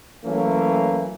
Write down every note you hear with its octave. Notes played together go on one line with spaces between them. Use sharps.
E3 F#3 A3 A#3 C#4